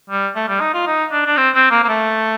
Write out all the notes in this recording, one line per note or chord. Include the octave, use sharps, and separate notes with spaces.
G3
A3
G3
D#4
F4
D#4
D4
D4
C4
C4
A#3
A#3
A3